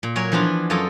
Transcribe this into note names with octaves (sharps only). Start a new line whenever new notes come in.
A#2
F#3 A#4 C#5 G#5
E3 F3 B3 D4 F4
F#2 F4 A4 C#5 D#5